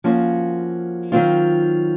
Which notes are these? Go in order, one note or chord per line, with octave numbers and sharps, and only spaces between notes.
F3 A#3 C#4 F#4 C5
D#3 F#3 C4 F4